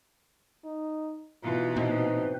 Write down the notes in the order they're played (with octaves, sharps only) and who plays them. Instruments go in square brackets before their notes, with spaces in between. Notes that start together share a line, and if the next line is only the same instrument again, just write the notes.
[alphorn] D#4
[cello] B2 E3 [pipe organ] D#4 [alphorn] F4
[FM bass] A#2 [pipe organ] C4 B4 C5 [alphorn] D#4